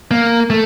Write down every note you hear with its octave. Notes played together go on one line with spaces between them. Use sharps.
A#3
A3